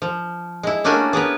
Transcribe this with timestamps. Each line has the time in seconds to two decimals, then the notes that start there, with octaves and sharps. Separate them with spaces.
0.02 F3
0.63 G#3 E4
0.84 A3 A#3 C#4 D4 F#4 G#5
1.13 B3 G#4 A#4 B4